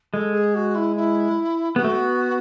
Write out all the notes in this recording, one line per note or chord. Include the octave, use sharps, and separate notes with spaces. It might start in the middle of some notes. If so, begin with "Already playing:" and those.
G#3 A4
G#4
F#4
E4
E4
B3 G#4
A3 F#4
B3